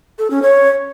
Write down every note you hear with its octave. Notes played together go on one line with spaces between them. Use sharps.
A4
C#4
C#5